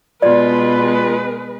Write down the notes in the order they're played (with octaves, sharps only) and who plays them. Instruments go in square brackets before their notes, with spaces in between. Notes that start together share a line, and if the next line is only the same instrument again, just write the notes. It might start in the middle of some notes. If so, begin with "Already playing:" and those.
[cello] B2 [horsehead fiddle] G#3 B4 [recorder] F4 [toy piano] D5